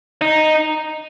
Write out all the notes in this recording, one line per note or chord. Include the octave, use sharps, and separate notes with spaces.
D#4